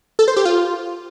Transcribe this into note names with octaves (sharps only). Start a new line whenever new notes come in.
A4
C5
G4
F4